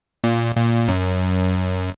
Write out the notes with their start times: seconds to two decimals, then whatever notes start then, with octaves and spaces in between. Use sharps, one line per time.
0.24 A#2
0.56 A#2
0.88 F#2